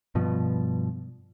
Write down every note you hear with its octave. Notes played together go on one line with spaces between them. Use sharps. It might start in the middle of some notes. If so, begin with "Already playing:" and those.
G2 B2 F3